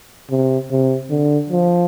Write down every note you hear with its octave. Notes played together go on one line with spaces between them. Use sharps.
C3
C3
D3
F3